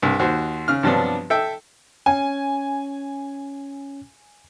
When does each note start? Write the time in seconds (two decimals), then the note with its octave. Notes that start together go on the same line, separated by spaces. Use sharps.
0.02 C2 G2
0.19 D#2 F#4 C5
0.68 C#3 F6
0.83 G2 C3 F3 F#3 B3 D4
1.30 A4 E5 G5
2.06 C#4 G#5